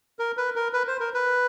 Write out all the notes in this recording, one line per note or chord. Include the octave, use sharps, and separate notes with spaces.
A#4
B4
A#4
B4
C5
A#4
B4